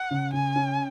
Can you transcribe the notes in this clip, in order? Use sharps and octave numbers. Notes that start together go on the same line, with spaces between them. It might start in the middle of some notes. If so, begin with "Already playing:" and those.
Already playing: F#5
C#3
C#3 G#5
C#4